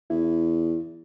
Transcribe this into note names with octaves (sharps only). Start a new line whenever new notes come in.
E2 E4